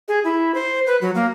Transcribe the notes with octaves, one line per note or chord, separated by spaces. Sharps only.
G#4
E4
C5
B4
F#3
A#3